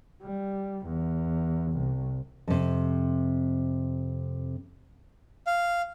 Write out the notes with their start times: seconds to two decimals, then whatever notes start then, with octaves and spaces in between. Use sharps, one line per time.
0.22 G3
0.86 E2
1.73 C2
2.48 F2 C3
5.47 F5